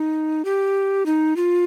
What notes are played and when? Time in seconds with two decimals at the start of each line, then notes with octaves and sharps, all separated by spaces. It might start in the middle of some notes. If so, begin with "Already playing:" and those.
Already playing: D#4
0.45 G4
1.06 D#4
1.36 F4